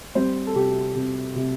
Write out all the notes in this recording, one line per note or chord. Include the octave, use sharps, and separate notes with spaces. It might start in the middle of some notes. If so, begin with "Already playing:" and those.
G3 C4 C5
A4
C3 G4
C3
C3